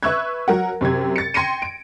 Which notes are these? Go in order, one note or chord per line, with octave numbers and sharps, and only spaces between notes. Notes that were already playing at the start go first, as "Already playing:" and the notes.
B4 E5 C#6 E6 F#6 G#6
F#3 A#4 F#5
F#2 C3 G4 G#6
A6 C#7
G5 C6 G#6 A#6 C#7 D#7
D7